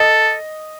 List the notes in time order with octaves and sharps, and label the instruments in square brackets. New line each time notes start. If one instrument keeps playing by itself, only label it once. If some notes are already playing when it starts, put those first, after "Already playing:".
Already playing: [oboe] A4 [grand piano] D#5